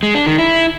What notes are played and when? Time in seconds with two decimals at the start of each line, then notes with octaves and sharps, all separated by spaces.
0.03 G#3
0.15 D4
0.27 D#3
0.38 E4